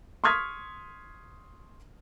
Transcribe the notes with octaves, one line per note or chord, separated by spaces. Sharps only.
C6 C#6 D#6 F6 G#6 B6